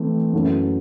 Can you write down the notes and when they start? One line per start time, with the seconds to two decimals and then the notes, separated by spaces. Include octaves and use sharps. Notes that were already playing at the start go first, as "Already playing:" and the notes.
Already playing: E3 A3 C4
0.33 F#2 F#3 B3 E4 A4